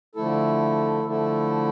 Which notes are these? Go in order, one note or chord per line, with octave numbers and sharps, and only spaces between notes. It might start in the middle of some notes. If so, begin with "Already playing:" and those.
D3 F3 A3 E4 A4
D3 F3 A3 E4 A4